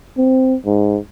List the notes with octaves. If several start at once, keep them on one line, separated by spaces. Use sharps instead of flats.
C4
G#2